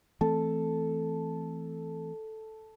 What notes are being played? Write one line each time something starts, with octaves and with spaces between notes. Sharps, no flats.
E3 A3 C4 A4